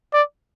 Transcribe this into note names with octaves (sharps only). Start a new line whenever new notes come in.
D5